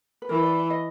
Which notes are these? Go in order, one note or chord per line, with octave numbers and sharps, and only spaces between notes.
B4
E3 A#4
D5
D#5